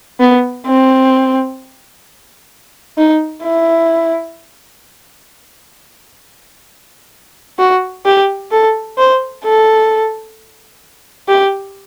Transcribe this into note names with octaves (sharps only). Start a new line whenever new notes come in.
B3
C4
D#4
E4
F#4
G4
A4
C5
A4
G4